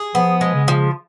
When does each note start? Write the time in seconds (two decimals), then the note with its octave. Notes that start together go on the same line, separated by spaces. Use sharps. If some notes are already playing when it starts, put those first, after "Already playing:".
Already playing: G#4
0.15 F3 B3
0.41 G#3
0.54 C#3
0.68 F3